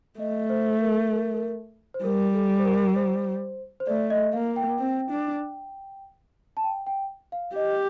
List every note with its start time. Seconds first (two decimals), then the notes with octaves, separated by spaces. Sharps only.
0.19 A3 D#5
0.49 C5
0.81 A#4
1.12 A#4
1.34 A#4
1.94 C5
2.04 G3 A#4
2.34 A4
2.59 C5
2.64 A#4
2.96 C5
3.80 C5
3.87 A3 D5
4.10 D#5
4.33 A#3 F5
4.56 G5
4.79 C4
5.11 D4
6.57 A5
6.64 G5
6.87 G5
7.32 F5
7.55 G4 D#5